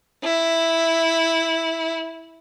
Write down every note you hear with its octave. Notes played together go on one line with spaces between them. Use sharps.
E4